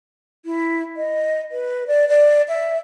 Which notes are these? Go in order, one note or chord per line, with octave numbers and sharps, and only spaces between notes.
E4
D#5
B4
D5
D5
E5